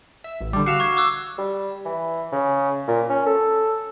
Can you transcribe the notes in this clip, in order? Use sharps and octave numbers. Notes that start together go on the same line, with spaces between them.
E5
A1
D3 G3 D6
F#4 F5 E6 C7 E7
C#6 G#6
D6 E6 F#6
G3
E3
C#3
A#2
C#4
A4